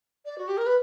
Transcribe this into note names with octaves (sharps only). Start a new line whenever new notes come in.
D5
F#4
G4
A#4
B4